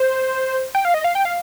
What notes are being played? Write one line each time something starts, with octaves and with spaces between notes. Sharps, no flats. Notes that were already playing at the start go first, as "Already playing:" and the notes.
Already playing: C5
G5
F5
D#5
F5
G5
F5